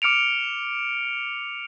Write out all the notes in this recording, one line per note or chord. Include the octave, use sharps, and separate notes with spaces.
D6 F6 C#7 D7 F7